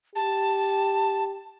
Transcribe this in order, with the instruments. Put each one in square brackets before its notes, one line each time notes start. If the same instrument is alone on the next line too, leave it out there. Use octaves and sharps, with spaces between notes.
[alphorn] G4 [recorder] A5